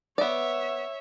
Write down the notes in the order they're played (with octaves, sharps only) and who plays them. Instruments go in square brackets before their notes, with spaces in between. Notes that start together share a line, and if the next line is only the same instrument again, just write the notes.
[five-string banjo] B3 D5 [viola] C#5 E5